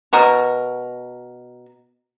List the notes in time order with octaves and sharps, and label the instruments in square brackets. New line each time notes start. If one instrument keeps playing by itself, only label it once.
[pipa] B2 F#4 A#4